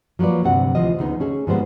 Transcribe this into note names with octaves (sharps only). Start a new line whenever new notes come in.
F3 F#3 A#3 B4 D5
D2 G2 C3 C4 F#5
D2 E3 F3 F4 D#5
D2 C#3 B3 D#4
C#4 G#4 A4
G#2 F3 G3 G#3 B3 C5